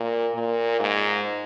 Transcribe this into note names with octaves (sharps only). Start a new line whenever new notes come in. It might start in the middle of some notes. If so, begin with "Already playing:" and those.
Already playing: A#2
A#2
G#2